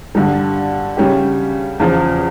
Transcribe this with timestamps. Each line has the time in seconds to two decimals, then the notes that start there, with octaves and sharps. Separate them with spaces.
0.15 G2 D3 G3
0.97 C#3 G3 C#4 G4
1.80 E2 C#3 F3